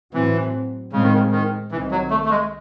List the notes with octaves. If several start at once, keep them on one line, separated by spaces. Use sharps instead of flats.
A2 E3 F#3 C4
A2 C#3 G#3 C4
D#3
C#3
D#3
C2 C3 D#3 E3
F#3
A3
A3
G#3